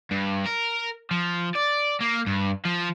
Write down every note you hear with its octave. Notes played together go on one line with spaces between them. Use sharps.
G2
A#4
F3
D5
A#3
G2
F3